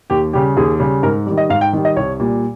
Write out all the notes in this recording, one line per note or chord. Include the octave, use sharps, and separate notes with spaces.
D#2 G4
C#3 G3 G4
D#2 G#4
C#3 G3
G#2 A#4
D#3 G3
D#5
G#2 F5
G5
D#3 G3
D#5
C2 C#5
A#2 G3